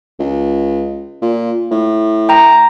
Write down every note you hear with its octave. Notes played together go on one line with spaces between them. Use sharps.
C#2
A#2
A2
G5 A#5